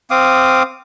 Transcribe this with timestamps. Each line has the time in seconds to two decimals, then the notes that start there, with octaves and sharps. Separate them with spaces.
0.11 C4 F5 D6 D#6